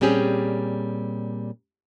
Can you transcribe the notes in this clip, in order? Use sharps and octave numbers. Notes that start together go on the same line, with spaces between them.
A#2 G3 C4 C#4 G4 G#4